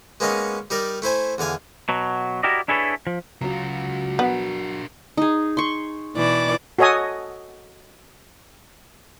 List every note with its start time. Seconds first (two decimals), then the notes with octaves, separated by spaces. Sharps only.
0.20 G#3 A#3 B3 C#4 D#4 D#5
0.70 G3 D#4 A#4 D5
1.02 A3 E4 C5 G#5
1.38 E2 D3 F5 G#5
1.89 B2 F#3
2.43 E4 F#4 G4 A#4 D5 D#5
2.68 D4 E4 G#4 A4 B4 C#5
3.07 F3
3.41 C#3 F#3 F4 F#4
4.19 B3 D4 A#4
5.17 D#4 G#4
5.57 C6 C#6
6.15 B2 E3 D5
6.79 F#4 A4 C#5 D#5 G#5 D#6